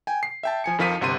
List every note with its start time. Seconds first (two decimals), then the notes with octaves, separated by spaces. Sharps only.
0.07 G5 G#5
0.23 C7
0.43 E5 G5 A5
0.64 F3 G#5 C#7
0.78 F2 D#3 F3 F5 B6 D#7
1.01 G1 C3 F#5 C6 D#7